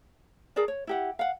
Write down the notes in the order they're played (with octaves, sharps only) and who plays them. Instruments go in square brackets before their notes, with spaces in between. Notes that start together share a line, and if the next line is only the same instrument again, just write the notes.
[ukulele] G#4 A#4 D5 A5
C#5
E4 G4 F#5
F5 F#5